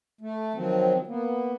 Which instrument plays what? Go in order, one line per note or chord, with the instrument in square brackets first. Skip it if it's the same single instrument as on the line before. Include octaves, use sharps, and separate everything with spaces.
[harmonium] A3
D#3 F3 F#3 C4
A#3 B3